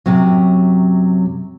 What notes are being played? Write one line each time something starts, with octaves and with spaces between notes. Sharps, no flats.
F#2 C3 F#3